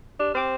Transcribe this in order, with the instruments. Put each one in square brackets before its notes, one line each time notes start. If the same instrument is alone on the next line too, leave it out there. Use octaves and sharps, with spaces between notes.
[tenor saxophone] D4 [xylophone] G4
[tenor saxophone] C4 [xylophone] C5 G5 D6 F6